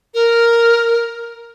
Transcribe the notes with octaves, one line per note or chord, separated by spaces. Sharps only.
A#4